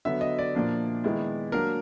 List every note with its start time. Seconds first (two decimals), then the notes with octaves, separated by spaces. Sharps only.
0.05 D3 F#3 B3 E5
0.21 D#5
0.39 D5
0.55 A#2 F3 A#3 D4
1.04 D#3 G#3 B3 E4
1.52 F#3 A#3 D4 A#4